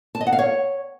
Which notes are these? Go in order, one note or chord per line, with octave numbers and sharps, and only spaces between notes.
A5
D#5
F#5
F5
C#5